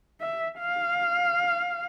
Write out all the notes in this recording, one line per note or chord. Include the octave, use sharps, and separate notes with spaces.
E5
F5